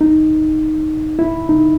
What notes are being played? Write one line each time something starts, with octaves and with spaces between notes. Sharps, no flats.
D#4
E4
D#4